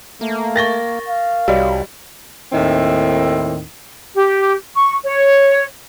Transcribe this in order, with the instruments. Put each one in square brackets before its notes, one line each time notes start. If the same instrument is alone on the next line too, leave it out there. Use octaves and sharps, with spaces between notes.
[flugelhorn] A3 [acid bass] A#3
[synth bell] A#4 C#6 [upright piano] A6 A#6 G7
[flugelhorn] F5
[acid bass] C2 [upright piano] G3 [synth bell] F#4 C#5 D#5
[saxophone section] D#2 A2 D#3 C4 E4
[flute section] G4
C#6
C#5